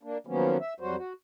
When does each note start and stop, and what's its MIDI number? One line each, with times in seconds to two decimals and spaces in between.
0.03 0.18 58
0.03 0.18 62
0.27 0.57 51
0.27 0.57 53
0.27 0.57 54
0.27 0.57 58
0.27 0.57 59
0.27 0.57 61
0.60 0.74 76
0.80 0.96 41
0.80 0.96 54
0.80 0.96 55
0.80 0.96 66
0.80 0.96 72
0.97 1.13 66